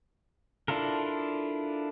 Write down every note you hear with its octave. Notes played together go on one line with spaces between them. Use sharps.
D4 E4 F4 A4 A#4